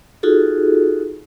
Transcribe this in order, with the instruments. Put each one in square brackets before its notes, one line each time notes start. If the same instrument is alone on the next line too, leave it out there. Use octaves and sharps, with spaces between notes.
[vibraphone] D#4 F4 F#4 G#4 A4